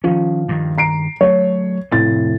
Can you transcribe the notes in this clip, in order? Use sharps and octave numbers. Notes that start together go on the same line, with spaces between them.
D#3 F3 C#4
G2 D#3
A#5 C7 D7
F#3 A3 C#5
F1 A2 C4 A6